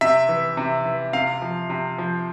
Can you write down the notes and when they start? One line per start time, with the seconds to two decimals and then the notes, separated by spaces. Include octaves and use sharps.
0.01 C3 E5
0.29 E3
0.57 C3
0.85 E3
1.13 C3 F5
1.42 F3
1.70 C3
1.98 F3